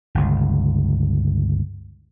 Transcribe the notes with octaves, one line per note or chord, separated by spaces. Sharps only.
G1 C#2